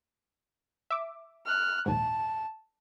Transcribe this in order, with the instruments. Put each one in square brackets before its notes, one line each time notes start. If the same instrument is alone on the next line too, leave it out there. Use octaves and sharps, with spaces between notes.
[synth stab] E5 D6
[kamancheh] F6 F#6
[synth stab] A#1 D#2 G#2 [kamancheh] A5